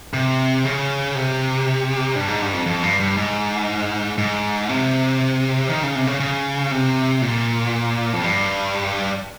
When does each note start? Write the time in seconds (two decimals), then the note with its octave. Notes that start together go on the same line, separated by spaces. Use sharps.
0.14 C3
0.65 C#3
1.15 C3
2.15 G2
2.28 G#2
2.42 G2
2.53 F2
2.66 F2
2.83 G2
3.00 G2
3.17 G#2
4.18 G#2
4.69 C3
5.69 D#3
5.83 C#3
5.95 C3
6.07 C#3
6.20 C#3
6.71 C3
7.22 A#2
8.13 F2
8.23 G2